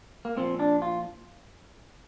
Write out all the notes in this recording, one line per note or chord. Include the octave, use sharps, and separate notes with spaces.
A#3
A#2 F3 C4
D4
F4